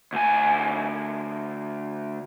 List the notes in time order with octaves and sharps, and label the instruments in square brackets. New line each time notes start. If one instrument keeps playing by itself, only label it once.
[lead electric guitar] D2 G#5